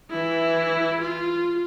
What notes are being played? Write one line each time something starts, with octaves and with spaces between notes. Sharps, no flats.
E3 E4
F4